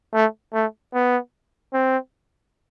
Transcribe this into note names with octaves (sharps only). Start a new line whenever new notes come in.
A3
A3
B3
C4